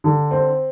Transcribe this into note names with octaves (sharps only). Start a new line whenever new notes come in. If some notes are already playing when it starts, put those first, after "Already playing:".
D3
C4